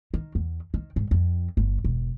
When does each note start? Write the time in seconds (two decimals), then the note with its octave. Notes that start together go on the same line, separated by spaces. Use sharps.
0.14 D#3
0.35 E2
0.74 D#3
0.96 G#2
1.11 F2
1.57 G1
1.84 E1